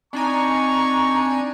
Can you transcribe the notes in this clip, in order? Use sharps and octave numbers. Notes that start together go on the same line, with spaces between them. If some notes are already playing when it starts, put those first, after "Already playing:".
C4 D4 D#4 G#5 A#5 C#6